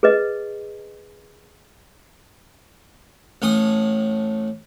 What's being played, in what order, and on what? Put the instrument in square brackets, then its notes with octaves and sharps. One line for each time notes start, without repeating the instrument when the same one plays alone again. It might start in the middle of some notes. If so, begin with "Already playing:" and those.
[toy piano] G#4 B4 D#5
[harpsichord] A1 A2 G#5 D#6